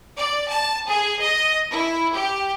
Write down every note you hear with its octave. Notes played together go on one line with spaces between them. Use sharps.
D5
A5
G#4
D#5
E4
G4